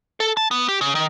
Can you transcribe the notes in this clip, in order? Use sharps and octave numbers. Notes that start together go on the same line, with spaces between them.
A4
A5
B3
G4
C#3
D#3